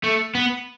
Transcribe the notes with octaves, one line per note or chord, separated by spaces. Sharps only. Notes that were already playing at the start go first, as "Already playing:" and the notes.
A3
B3